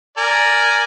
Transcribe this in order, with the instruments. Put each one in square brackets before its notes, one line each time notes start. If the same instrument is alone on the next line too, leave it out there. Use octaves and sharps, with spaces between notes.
[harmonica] A#4 D5 G#5